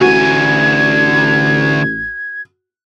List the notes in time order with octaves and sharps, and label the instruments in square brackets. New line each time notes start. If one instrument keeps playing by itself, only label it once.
[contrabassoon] A1 [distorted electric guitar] D2 G#5 [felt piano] F#4 [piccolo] G#6